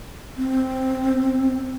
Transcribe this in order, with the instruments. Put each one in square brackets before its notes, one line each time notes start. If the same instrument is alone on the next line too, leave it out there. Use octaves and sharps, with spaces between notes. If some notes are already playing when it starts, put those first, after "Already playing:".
[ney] C4